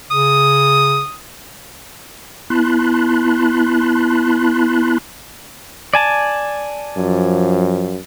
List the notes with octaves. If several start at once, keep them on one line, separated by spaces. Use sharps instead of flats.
C#3 D#6
B3 E4 A5 B5 C6 F#6
D5 G#5 A5
F#2 F3